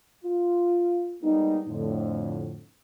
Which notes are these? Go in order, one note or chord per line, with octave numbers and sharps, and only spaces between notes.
F4
G3 G#3 A#3 B3 D#4
F2 A2 D3